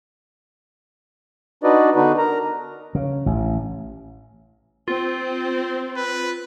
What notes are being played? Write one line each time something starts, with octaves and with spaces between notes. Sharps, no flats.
D4 D#4 F#4 B4 D5 D#5
D3 B3 D4 D#4 F#4 B4
A#4 A#5
C#3
A1
C4 F4
B4